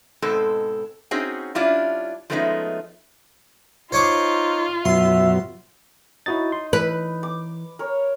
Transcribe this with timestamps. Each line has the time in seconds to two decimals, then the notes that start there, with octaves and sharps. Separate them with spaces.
0.22 G#2 B2 G#3 C4 A4
1.11 C4 C#4 D#4 F#4 G#4
1.55 G3 C#4 D4 E4 F4
2.30 F3 G#3 A3 B3 C#4 D#4
3.92 D#4 F4 C5 C#5 D6
4.85 F#2 B2 F#3 E5 C6
6.26 D#4 E4 F#4 A6
6.52 C6
6.73 E3 B4
7.23 D6
7.79 A#4 C#5